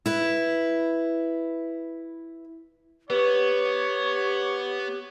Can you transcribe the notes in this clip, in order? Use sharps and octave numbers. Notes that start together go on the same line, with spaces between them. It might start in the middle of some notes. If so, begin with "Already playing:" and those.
E4 B4
B3 G4 B4 C#5